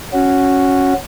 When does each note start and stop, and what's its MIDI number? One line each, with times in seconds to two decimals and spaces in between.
0.13 0.94 61
0.13 0.94 66